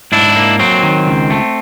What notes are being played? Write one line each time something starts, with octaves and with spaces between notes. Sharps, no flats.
G#2 D4 E4
A#3
F#3 C4
D#3
C#2
A3